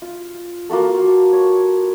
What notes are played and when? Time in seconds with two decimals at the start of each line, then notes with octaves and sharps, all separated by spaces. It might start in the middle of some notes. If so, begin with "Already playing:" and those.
0.02 F4
0.69 A#3 F4 F#4 A4
1.33 C#5